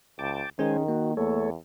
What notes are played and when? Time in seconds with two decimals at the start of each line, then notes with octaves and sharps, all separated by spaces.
0.19 C#2 G5 A5 D6
0.59 D#3 G#3 C#4 G#4 A#4 C5 G#5
0.88 A#3 F#4
1.17 E2 A3 A4 C#5